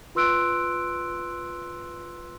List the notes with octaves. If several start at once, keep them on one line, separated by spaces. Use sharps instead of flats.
F4 B4 C6 E6 F#6 D7